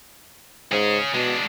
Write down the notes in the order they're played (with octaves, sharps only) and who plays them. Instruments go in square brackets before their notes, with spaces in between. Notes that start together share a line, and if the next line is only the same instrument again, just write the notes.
[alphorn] G#2 [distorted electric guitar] C#4 G#4
[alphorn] B2 [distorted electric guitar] G#3 D4